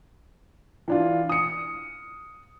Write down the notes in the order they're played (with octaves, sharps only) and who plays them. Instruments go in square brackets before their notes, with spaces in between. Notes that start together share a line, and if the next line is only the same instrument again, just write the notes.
[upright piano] E3 D4 F4
D#6 C#7